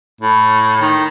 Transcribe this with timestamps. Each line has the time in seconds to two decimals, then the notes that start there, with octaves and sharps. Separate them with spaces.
0.21 A2
0.81 D#3